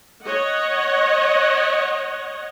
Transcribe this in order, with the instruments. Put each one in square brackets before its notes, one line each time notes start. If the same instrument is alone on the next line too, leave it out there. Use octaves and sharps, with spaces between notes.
[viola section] C#5 D#5 F#5